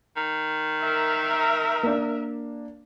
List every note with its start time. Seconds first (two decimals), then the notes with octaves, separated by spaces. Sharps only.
0.17 D#3
0.81 A#4 E5
1.83 A#3 D4